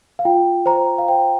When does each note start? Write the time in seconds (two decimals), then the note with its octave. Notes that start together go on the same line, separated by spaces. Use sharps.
0.19 F5
0.25 F4 G5
0.66 C5 A#5
0.98 F5
1.08 C5 G5